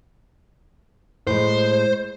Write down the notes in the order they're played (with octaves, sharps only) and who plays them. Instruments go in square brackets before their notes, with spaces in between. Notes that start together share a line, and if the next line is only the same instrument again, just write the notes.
[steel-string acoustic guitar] A2 G#3 [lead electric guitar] C5